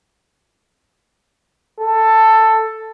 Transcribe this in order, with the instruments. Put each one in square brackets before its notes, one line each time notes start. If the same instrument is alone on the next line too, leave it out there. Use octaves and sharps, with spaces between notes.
[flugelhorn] A4